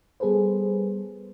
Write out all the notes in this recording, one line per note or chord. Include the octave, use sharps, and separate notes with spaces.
G3 B3 G#4 A4 B4 C5